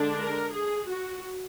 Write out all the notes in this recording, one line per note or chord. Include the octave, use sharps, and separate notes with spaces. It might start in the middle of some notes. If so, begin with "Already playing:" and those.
Already playing: D3 G#3 D4
A#4
G#4
F#4